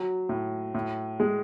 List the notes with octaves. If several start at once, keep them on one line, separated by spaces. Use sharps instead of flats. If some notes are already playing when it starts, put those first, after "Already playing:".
Already playing: F#3
A2
A2
G#3